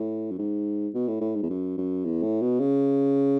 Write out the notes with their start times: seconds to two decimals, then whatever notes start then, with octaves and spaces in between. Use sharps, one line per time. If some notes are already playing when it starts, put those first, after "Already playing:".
Already playing: A2
0.31 F#2
0.39 G#2
0.94 B2
1.08 A2
1.21 A2
1.35 G#2
1.43 E2
1.49 F#2
1.77 F#2
2.05 E2
2.22 A2
2.41 B2
2.60 C#3